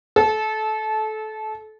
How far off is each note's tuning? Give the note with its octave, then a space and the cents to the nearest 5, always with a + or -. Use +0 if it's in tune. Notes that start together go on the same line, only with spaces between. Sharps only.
A4 -25